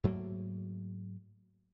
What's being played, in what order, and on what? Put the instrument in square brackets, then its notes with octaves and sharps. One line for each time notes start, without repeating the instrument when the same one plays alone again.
[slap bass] G#2 F#3 A3 A#3